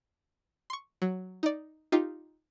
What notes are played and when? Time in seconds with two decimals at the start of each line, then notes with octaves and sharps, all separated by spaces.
0.70 C6 C#6
1.02 F#3
1.43 D#4 D5
1.92 D#4 F4 G4